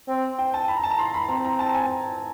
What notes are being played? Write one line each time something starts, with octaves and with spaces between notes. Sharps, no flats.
C4
G5
A5
B5
A#5
A5
A#5
C6
B5
C4 A#5
A#5
A5
G#5